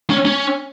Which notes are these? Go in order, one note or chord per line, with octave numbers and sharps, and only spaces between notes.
C#4
C#4